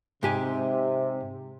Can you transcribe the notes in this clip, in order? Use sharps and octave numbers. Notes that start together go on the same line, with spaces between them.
G#2 C3 G4 G#5